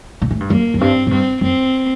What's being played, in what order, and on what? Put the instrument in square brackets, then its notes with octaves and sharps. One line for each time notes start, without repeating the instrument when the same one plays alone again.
[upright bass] A#2
A2
G2
[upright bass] F#2 [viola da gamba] A#3
[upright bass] F#2
[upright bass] G2 [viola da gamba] C4
[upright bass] A2
[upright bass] G2 [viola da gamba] C4
[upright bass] F#2 [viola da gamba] C4